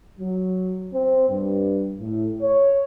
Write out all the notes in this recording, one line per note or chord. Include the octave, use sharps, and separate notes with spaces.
F#3
C4
G2
A2
C#5